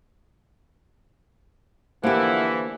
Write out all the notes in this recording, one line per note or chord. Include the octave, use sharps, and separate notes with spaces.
D3 E3 F3 A#3 E4 G4 F#5